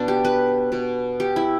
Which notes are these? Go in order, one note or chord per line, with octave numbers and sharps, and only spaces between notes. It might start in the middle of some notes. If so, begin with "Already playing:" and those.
Already playing: B2 B3 D4
G4
B4
B2 B3
G4
E4